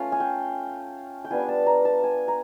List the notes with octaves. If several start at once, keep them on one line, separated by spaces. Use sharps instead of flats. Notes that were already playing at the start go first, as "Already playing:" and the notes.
Already playing: A3 C#4 F4 F5
G#5
G5
G5
G3 B3 D4 F4 G#5
A5
A#5
A5
G#5
A#5